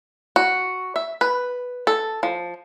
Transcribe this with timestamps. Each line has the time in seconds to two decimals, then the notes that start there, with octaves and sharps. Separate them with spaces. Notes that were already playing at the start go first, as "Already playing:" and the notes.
0.36 F#4
0.96 E5
1.21 B4
1.87 A4
2.23 F3